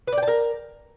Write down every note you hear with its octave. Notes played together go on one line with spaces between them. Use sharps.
B4
D5
G5
A5
A#4